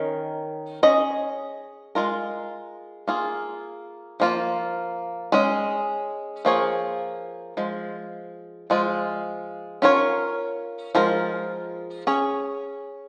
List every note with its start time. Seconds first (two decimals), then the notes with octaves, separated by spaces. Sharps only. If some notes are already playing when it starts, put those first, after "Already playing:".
Already playing: D#3 C#4 A#4
0.83 C#4 G#4 D#5
1.95 G#3 F4 A#4
3.07 A#3 F4 G#4
4.20 F3 A#3 F4
5.32 G#3 C#4 G#4 D#5
6.45 F3 A#3 F4 G#4 C#5
7.57 F3 G#3
8.70 F3 G#3 F4
9.82 C#4 F4 A#4 C#5
10.95 F3 G#3 F4 A#4
12.07 C#4 G#4 C#5